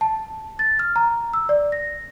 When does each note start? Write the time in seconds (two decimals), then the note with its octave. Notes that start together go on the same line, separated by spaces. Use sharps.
0.01 A5
0.59 A6
0.79 F6
0.96 A#5
1.33 E6
1.49 D5
1.72 A#6